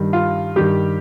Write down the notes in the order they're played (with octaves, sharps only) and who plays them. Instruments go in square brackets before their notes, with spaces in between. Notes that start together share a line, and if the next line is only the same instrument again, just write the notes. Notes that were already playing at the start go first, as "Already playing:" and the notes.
Already playing: [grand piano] G2 D#3 G3
F4
G2 D#3 G3 G4